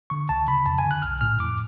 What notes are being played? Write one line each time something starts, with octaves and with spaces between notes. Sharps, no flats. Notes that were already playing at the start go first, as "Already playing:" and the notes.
D3 C#6
C#2 A5
C#3 B5
F2 A5
G#5
D3
F#6
B1 F6
A2 F6
F2 D6